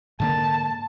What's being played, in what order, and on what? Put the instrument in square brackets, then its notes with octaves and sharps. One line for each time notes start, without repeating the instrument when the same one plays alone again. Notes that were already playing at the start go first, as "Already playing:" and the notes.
[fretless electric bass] G#2 D3 A#3 [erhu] A5